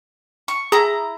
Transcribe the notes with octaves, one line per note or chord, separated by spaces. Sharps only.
C#6
E4 G#4 A#5